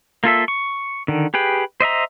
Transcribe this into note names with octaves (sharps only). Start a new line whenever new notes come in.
A#3 F4 A4 E5
C#6
D3 D#3
G4 G#4 B4 G5
C5 D#5 E5 A#5